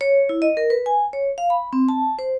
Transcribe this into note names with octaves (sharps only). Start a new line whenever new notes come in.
C#5
E4
D#5
A#4
B4
G#5
C#5
F5
B5
C4
A5
C5